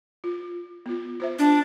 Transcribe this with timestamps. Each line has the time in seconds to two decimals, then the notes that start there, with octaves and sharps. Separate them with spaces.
0.24 F4
0.86 B3 F4
1.20 F4 C5 E5
1.39 D4